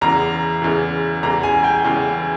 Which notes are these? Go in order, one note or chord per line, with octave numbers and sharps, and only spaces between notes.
E2 C#3 E3 A#5
E2 C#3 E3
E2 C#3 E3 A#5
G#5
G5
E2 C#3 E3